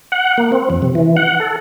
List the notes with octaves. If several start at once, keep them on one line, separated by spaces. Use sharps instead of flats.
F#5
A#3
C4
F2
C3
E3
F#5
A4